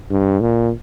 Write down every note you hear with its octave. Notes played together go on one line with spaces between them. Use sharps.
G2
A#2